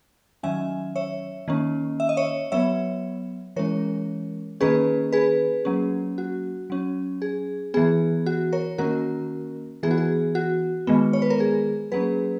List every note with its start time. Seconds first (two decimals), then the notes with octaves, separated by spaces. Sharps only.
0.43 D#3 F#3 C#4 E5 G#5
0.96 C#5 E5
1.48 D#3 A#3 C#4
2.00 E5
2.09 D#5
2.17 C#5 E5
2.52 F#3 B3 C#5 E5
3.56 E3 G#3 C#4 A#4 C#5
4.60 D#3 A#3 C#4 G#4 B4
5.13 G#4 B4
5.65 F#3 A#3 C#4
6.18 F#4
6.70 F#3 C#4
7.22 G#4
7.74 E3 B3 G#4
8.26 F#4
8.53 A#4 C#5
8.78 D#3 A#3 C#4 F#4 A#4
9.83 E3 B3 G#4
9.91 F#4
9.98 G#4
10.35 F#4
10.87 D#3 G#3 B3
11.13 C#5
11.22 B4
11.30 A#4
11.40 G#4
11.92 F#3 A#3 C#4 G#4 B4